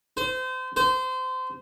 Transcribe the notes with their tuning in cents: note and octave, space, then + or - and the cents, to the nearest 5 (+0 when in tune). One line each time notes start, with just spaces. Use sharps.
C5 -30
C5 -25